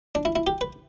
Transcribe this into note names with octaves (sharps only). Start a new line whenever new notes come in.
D4
E4
E4
G4
B4